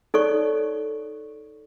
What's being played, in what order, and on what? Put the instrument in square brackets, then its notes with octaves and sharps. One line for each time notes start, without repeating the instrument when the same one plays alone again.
[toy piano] D#4 A4 C#5 D5 C#6